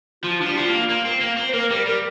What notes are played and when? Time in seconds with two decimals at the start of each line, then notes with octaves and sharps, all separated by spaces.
0.24 F3 F4
0.40 F3 D4
0.46 G3
0.56 C4 F4
0.68 A#3
0.89 A#3
1.05 C4
1.21 A#3
1.37 C4
1.49 C5
1.54 A#3 A#4
1.70 G3
1.76 A#4
1.86 G3 A#4